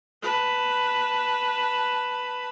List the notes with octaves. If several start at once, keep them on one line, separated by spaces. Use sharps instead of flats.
B4 A5